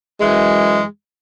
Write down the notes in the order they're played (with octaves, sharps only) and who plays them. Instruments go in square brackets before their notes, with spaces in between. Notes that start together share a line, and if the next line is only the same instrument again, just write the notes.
[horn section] F#2 E3 G#3